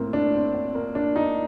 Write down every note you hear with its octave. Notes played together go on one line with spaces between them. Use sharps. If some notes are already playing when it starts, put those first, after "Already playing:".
Already playing: A2 A#3 C4
D4
C4
C4
A#3
D4
D#4